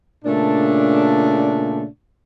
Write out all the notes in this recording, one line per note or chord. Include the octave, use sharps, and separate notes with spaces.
A#2 C#3 A3 D4